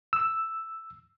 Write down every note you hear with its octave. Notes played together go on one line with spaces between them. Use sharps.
E6